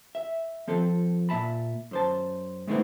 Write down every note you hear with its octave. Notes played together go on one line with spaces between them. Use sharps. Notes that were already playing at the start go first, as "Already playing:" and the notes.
E5
F3 C4 A4
A#2 E5 A5 B5
F#2 C5 A5
G#3 A3 B3 C4 D#4 E4